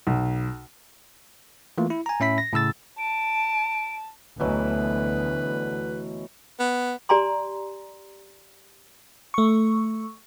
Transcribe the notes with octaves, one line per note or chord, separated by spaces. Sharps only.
B1
E3 A3 A#3 F4
E4
G#5 A#5
A2 C#4 E5 B5 B6
A#6
A2 C#3 E6 A6
A5 D7
D2 B2 E3 F#3 B4
B3
G4 D5 G#5 A#5 C6
A3 C#6